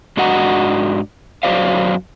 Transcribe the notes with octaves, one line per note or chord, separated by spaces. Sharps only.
G#2 D4 F#4 D#5 F#5 A#5
F#2 F3 F#3 C5 D5 F5